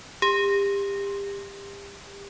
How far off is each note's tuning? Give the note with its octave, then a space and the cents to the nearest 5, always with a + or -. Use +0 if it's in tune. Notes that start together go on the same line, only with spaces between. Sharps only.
G4 +30